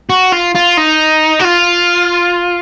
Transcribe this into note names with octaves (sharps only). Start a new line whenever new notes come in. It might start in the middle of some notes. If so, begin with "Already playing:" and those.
F#4
F4
F4
D#4
F#4
F4